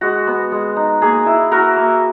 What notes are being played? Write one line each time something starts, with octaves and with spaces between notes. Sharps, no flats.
G#3 F#4
B3
G#3
D#4
A#3 G#4
E4
E4 F#4 A#4
A#3